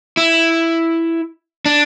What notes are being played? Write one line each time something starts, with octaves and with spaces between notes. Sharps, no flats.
E4
D4